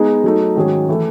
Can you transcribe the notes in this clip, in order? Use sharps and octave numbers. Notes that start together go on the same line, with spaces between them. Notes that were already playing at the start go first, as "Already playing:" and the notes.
Already playing: G#3 B3 D#4 G#4
F#3 A3 D#4
G#2 D#3 F#3 C#4 G#4
E3 A3 E4